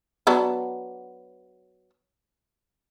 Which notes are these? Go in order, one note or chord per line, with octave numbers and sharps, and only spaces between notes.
F#3 B3 D4